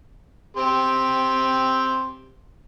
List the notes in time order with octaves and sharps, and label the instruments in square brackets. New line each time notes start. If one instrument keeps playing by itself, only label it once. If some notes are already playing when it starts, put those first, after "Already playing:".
[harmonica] C4 G4 C6